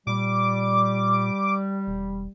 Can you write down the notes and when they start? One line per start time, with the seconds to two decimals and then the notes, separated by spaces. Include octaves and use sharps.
0.07 A#2 G3 D6
1.87 E1